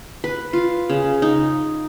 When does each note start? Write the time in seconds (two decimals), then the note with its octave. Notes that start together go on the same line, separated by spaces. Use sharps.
0.24 B4
0.53 F4
0.89 C#3
1.22 D#4